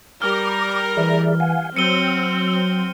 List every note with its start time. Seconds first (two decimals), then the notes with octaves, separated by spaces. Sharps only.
0.22 G3 A#4 D6 F6
0.97 E3 G#4 D5 E5
1.40 F5 F#5 G#5
1.76 F#3 C4 E6 C#7 D#7 G7